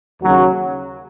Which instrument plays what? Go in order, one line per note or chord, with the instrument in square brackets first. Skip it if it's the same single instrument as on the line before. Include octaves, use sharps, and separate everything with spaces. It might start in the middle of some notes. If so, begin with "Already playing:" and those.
[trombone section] D#2 C#3 F#3